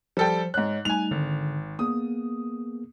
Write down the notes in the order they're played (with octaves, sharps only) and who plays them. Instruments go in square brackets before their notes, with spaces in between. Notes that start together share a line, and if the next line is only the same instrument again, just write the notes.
[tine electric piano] F3 C5 [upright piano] G3 A4 G5
[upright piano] G#2 F#6 [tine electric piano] C#5 D#5
[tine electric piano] G3 A3 D#4 [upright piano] G#5 F7
[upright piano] G#1 [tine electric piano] D3
[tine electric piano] A#3 B3 G#4 [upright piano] D#6